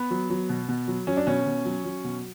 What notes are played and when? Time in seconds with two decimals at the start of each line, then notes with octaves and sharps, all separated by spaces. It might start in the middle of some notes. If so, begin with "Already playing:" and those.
Already playing: B3
0.11 F#3
0.30 F#3
0.49 B2
0.69 B2
0.88 F#3
1.07 F#3 C#4
1.17 D4
1.26 B2 C#4
1.46 B2
1.65 F#3
1.85 F#3
2.04 B2